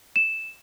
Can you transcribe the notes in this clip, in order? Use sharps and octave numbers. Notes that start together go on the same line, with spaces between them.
E7